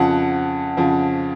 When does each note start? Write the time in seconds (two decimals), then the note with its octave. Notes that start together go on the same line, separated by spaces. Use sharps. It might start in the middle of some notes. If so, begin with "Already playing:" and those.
Already playing: F2 C#3 F3 F#5
0.77 F2 C#3 F3